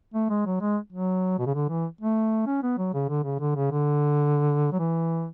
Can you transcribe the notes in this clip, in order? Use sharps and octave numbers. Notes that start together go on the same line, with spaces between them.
A3
G#3
F#3
G#3
F#3
B2
C#3
D3
E3
A3
C#4
B3
F#3
C#3
D3
C#3
D3
C#3
D3
F#3
E3